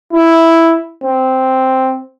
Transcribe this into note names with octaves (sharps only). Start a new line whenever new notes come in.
E4
C4